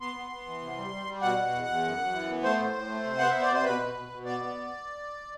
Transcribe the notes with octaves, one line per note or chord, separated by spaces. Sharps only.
B3 C6
B3
B3
E3
C3
G3
G3
G3
B2 F#5
B2
E2
E2
F#2
F#2
E3
B3
A3 C5
A2
A2
A3
C3
B3 F#5
B3 E5
D5
C3 C5
B2 B4
B2
B2
B2
B3 D5
B3